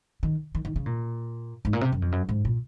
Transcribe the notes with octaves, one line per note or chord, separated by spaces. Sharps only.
D#3
D#3
D#3
C#3
A#2
G#2
A#2
C3
F#2
F2
F#2
G#2
A#2